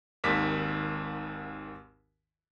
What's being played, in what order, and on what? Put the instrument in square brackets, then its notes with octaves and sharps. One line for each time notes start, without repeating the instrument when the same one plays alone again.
[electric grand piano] G#1 D#2 D#3 D6 B6